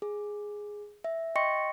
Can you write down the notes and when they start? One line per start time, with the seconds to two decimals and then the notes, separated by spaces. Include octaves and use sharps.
0.02 G#4
1.04 E5
1.36 D#5 G5 C6 C#6 A#6 C#7